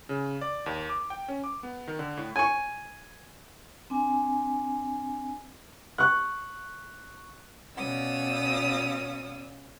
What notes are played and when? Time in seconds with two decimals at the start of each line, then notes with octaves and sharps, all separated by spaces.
0.09 C#3
0.41 D5
0.66 D#2
0.89 D6
1.10 G5
1.28 C#4
1.44 D6
1.63 B3
1.88 D#3
1.99 D3
2.17 A2
2.36 G#5 C#6
3.90 C4 D4 G#5
5.98 C#6 F#6
7.77 B2 C#4 D5 F5 D#6 E6